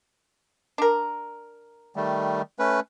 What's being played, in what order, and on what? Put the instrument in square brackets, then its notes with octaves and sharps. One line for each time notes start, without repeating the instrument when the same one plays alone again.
[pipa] D4 A#4
[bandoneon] D#3 G3 A3
A3 C#4 B4